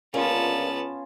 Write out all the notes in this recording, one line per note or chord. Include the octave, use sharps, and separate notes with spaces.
C#2 D3 G3 A#3 B3 C#4 F4 A5